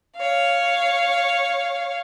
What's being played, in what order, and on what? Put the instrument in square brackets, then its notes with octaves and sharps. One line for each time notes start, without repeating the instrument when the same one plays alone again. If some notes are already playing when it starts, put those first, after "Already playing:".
[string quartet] C#5 F5